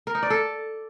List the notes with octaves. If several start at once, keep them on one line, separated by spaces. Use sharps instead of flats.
A#4
D#4
D5
A4